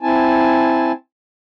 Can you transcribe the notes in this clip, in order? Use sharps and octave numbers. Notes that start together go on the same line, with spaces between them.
C4 E4 G#5 A5